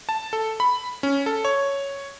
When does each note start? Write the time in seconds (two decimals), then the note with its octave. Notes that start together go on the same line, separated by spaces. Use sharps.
0.09 A5
0.33 A4
0.60 B5
1.03 C#4
1.26 A4
1.45 C#5